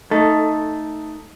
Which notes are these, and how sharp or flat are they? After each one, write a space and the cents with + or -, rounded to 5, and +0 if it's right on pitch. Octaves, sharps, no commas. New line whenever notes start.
A3 +15 D#4 +0 A4 +0